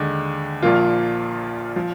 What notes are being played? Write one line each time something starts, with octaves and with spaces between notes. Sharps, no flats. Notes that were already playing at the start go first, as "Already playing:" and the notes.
Already playing: D#2 D3 G#3
A#1 A#2 F3 A#3 F4
F3